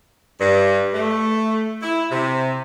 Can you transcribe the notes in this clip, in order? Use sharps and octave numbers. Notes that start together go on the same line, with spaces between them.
G2
A3
E4
C3